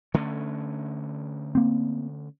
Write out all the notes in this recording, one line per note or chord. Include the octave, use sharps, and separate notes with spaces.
D3 A3 C#4
A#3 C4